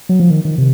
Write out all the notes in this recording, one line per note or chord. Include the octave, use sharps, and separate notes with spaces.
F#3
F3
D#3
D#3
C3